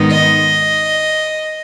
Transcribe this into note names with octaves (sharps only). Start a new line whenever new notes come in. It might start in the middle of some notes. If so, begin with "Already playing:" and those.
Already playing: G#2 D#3 G#3 B3 D#4
D#5